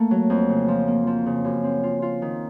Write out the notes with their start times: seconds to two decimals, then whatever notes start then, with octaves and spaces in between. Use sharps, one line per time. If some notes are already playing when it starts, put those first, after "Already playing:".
Already playing: A3 A#3
0.11 F#3
0.30 F2
0.49 C#3
0.68 F3
0.88 A#3
1.07 F3
1.26 C#3
1.45 F#2
1.64 C4
1.83 F4
2.02 F4
2.22 D#3